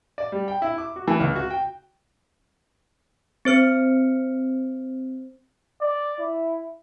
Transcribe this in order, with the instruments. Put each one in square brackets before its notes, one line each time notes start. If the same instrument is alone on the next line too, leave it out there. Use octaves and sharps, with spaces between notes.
[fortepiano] D5
G3
G5
E4
D6
F#4
E3
C#2
F#4
G5
[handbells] C4 C5 F6 C#7
[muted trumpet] D5
E4